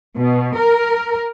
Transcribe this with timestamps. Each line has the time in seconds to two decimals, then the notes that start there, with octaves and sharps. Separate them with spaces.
0.17 B2
0.57 A#4